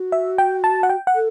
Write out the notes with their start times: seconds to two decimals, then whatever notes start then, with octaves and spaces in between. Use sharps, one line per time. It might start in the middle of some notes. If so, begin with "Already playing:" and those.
Already playing: F#4
0.12 E5
0.38 G5
0.64 A5
0.83 F#5
0.90 G5
1.07 F#5
1.15 A4